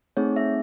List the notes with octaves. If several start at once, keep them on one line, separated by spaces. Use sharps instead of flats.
A3 C4 D#4 G#4 C#5
E5